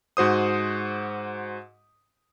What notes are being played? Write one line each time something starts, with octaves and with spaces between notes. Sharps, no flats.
G#2 F#4 C5 D#6